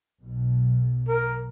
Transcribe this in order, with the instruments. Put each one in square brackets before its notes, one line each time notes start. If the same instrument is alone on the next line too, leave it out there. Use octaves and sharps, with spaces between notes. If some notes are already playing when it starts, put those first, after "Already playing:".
[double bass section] B1 B2
[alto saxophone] A#4